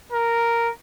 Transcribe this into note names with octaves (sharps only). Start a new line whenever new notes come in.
A#4